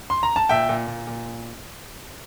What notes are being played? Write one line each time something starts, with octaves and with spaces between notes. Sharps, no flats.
C6
A#5
A5
A#2 E5 G5
A#2
A#2
A#2